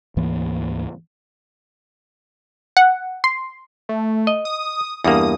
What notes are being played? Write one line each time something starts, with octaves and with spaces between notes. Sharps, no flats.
D2 G#2 E3 A#3
F#5
C6
A3
D#5
D#6
E2 G2 A#3 D#6